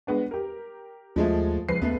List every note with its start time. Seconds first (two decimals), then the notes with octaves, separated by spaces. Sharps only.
0.07 G#3 B3 D4
0.31 G4 A#4
1.16 D#2 F3 G#3 A3
1.69 C#2 F3 B4 C7
1.82 D#2 A3 B3